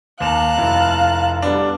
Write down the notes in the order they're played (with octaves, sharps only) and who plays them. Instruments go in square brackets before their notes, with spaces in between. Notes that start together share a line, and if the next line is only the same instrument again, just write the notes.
[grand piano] D#2 E7 F7 [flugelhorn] F5 [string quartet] A5 A#5 F#6
[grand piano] F1 E4
G3 B3 D4